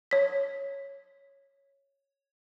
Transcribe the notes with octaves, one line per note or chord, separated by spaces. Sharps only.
C#5 B6